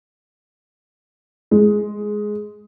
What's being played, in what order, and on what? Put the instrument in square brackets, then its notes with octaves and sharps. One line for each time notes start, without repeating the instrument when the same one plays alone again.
[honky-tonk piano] G#3